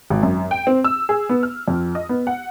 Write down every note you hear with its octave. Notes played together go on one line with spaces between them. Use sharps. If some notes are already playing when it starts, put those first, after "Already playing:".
G#1
F#2
G5
C4
E6
G#4
B3
F6
F2
D#5
B3
F#5